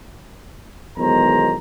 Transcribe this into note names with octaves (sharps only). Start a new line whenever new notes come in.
B1 E2 D#3 G#3 C5 A#5